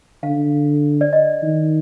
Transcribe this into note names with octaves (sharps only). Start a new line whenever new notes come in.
D3 F5
D5
D#5
D#3